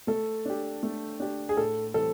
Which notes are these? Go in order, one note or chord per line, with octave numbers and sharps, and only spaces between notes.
A3 A4
D4 G4
A3
D4 G4
G#4
A2 A4
E3 G3 C4 A4